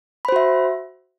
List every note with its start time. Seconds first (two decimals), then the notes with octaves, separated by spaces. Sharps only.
0.25 B5
0.29 C5
0.32 F#4
0.36 E5